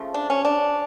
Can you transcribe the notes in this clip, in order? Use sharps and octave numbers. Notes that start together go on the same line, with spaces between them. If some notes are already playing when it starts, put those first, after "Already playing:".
Already playing: C#3 F3 A3
D4
C#4
D4